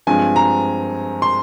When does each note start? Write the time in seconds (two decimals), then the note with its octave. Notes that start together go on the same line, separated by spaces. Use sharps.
0.07 G2 F3 G#3 C4 G#5
0.36 A#5
1.22 C6